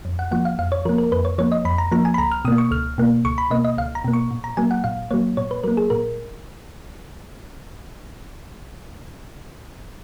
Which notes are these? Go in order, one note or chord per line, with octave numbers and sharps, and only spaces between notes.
F2
F#5
F3 A#3 F#5
F5
F2 F5
C#5
F3 A#3 A#4
A#4
F2 B4
C#5
F3 A#3 C#5
D#5
F2 B5
A#5
F3 A#3 A#5
G#5
B5
C#2 A#5
F6
B2 A#3 D#6
C#6
C#2 F6
B2 A#3
C#2 C#6
B5
B2 A#3 D#5
D#5
C#2 F5
A#5
B2 A#3
C#6
A#2
A#5
F#3 A#3 G#5
F#5
A#2 F5
F#3 A#3 C#5
A#2 C#5
B4
F#3 A#3 A#4
G#4
A#2 A#4